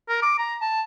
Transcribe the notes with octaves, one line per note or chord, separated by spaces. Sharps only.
A#4
D6
A#5
A5